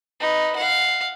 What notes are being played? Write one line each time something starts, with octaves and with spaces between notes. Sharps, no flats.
D#4 B4
F5 F#5